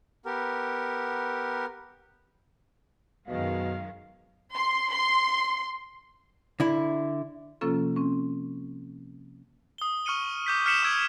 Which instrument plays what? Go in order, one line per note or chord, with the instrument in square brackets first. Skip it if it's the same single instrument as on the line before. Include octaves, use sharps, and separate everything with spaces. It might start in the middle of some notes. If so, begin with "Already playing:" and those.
[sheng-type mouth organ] B3 G4 A#4
[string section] F#2 D#3 G#3 [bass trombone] B2 [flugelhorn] F5
[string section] C6
C6
[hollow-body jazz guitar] D3 E4
[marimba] C3 F3 A#3 C#4 F4 A4
C4 C#4
[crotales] D#6 G7
C#6 F6 C#7 D#7 G7
D6 G6 B6
F6 G6 B6 C#7 E7 F#7
C#6 D#6 E6 G#6 D7 F#7